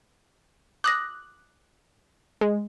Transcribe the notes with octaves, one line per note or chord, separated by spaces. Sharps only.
D6 D#6 F#6 A#6
G#3